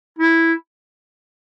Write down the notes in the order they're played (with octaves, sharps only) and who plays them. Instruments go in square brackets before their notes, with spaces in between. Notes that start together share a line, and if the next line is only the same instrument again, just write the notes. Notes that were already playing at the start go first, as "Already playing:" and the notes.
[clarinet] E4